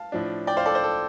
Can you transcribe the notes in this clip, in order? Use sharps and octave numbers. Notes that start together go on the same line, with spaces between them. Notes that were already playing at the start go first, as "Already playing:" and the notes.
Already playing: F5 A5
A2 F3 D4
D5 G5
C5 F5
A4 D5
C5
A4